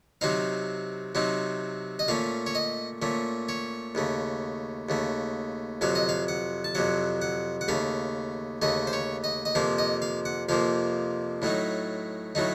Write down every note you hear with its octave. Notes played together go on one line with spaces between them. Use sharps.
C3 F#3 C4 D#4 F5
C3 F#3 C4 D#4
D#5
A#2 A3 C#4 F5
C#5
D#5
A#2 A3 C#4
C#5
D#2 C#3 A3
D#2 C#3 A3
F2 C3 F#3 F5
D#5
F5
F#5
A5
F2 C3 F#3 F#5
F#5
F#5
D#2 C#3 A3 F5
D#2 C#3 A3 D#5
C5
C#5
D#5
D#5
F2 C3 F3 A#3 F5
D#5
F5
F#5
F2 C3 F3 A#3 F5
A2 F#3 A3 D#4
A2 F#3 A3 D#4